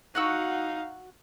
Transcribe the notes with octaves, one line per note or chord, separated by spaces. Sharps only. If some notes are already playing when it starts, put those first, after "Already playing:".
D#4 F#4 F5 F#5 E6